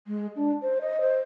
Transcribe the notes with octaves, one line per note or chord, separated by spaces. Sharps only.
G#3
D4
C5
D#5
C5